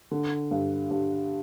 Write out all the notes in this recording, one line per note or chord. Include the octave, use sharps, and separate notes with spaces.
D3
G2
G2